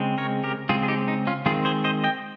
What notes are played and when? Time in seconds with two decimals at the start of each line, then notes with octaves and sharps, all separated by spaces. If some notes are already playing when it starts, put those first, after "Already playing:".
Already playing: C#3 G#3 C4
0.18 A#4 C#5
0.44 G4 A#4
0.69 C#3 G#3 C4 F4 G#4
0.83 G#4
0.88 D#4 G4
1.08 D#4
1.27 C#4 F4
1.46 D#3 G#3 C4 F4 G#4
1.65 G#4 C5
1.84 C5 D#5
2.04 D#5 G5